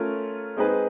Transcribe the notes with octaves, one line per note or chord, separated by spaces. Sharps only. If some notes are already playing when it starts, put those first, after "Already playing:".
Already playing: A3 C#4 F4 A#4
G#3 C4 D#4 G#4 B4